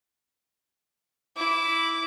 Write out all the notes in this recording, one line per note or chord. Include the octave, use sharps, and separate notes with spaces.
E4 D6